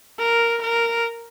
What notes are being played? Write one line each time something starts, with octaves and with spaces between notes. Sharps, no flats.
A#4
A#4